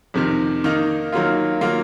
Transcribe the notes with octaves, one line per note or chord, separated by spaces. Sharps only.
F2 C3 D#3
D#3 A#3 D#4
D#3 F#3 A#3 F4
D#3 F#3 A#3 F4